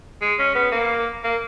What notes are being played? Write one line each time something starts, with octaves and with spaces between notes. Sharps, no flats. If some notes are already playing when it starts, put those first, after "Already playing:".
G#3
C#4
B3
A#3
A#3